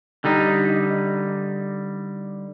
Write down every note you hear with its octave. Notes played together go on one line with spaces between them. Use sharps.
D3 G3 D#4